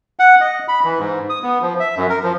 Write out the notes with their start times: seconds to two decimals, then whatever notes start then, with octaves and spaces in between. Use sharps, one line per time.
0.19 F#5
0.41 D#5
0.68 B5
0.84 E3
0.99 G#2
1.30 D#6
1.43 B3
1.62 F3
1.80 E5
1.97 F#2
2.09 A#4
2.23 F3